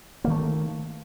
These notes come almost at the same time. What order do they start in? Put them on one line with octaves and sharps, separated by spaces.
A#3 D#3 A3